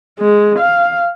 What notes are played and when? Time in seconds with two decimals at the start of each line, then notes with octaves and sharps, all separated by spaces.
0.19 G#3
0.59 F5